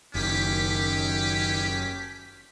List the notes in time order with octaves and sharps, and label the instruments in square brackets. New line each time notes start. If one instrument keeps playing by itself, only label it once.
[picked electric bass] F#1 [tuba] D#3 [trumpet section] C#4 G4 [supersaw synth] B6